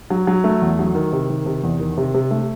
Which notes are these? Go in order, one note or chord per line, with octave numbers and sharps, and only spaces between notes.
F#3
F#3
A3
E2
F#3
D#3
C3
D#3
C3
E2
D#3
C3
C3
A3